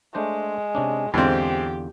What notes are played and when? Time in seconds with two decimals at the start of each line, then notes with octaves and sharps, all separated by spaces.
0.15 G#3 A3 D4 C5
0.75 C3 C#4 D4
1.14 E2 G#2 D3 C4 F4 G4